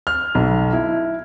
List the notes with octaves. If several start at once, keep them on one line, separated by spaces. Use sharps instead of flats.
F6
B1
E4